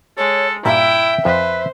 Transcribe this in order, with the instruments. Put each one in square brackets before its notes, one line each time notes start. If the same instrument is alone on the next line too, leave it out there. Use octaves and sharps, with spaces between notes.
[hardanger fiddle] G#3 [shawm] A4 [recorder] C#5
[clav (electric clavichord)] G2 A#2 G3 [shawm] E4 [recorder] E5 [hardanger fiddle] G5
[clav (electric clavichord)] F2 F3 A5 [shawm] B4 [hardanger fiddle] C5